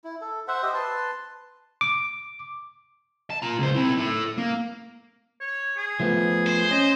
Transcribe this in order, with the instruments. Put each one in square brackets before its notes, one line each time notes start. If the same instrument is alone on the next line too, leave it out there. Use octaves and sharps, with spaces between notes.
[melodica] E4
A4
C5 E5 F#5
G4 C5 D#5
B4 A5 C6
[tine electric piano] D6
[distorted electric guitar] A5
F4 A#5
C#2 C5
C4 E4
E4 A4
A#3
[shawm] C#5
G#4
[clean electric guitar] F3 A3 B3
[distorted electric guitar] C5
[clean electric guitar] C#4 [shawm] D#5